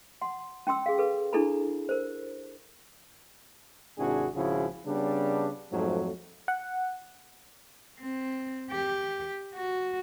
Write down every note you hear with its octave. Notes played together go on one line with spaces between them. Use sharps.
F#5 C6
C#4 G5 C6 E6
G#4 F5
G#4 A4 B4
D4 E4 G#4 A4 A#5 B5
A#4 C5
G#1 C3 D4 E4 F#4 G#4
G#1 C#3 F3 E4 F#4 G#4
C#3 G3 B3 D4
F2 G#2 F3 F#3 A3
F#5
C4
G4
F#4